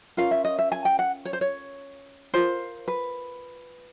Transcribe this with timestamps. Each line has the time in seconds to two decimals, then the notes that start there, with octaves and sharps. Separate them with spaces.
0.17 C#4 F4 A#4 F5
0.31 E5
0.45 D#5
0.59 E5
0.72 G#5
0.85 G5
0.99 F#5
1.25 C#5
1.33 C5
1.41 C#5
2.34 F4 A#4 C5
2.88 B4